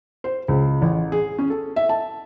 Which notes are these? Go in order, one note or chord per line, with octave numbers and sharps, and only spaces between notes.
C5
C#2
A1
G#4
C#4
A4
E5
A5